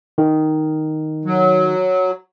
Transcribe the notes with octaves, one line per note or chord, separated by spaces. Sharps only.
D#3
F#3